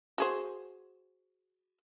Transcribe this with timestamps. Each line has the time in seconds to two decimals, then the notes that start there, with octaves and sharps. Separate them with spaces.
0.18 F#4 G#4 C5